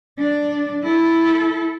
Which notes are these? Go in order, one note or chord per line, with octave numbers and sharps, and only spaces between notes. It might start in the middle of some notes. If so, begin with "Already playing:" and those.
D4 D5
E4 A4